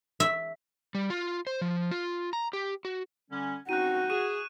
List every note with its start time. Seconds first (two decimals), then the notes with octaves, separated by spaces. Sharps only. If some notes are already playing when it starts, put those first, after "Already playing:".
0.20 E5
0.95 G3
1.10 F4
1.47 C5
1.62 F3
1.91 F4
2.33 A#5
2.53 G4
2.85 F#4
3.31 D3 G3 C#4
3.69 C4 C#4 D#4 F#4 F#6 D#7
4.10 G#4 C#6 D#7 E7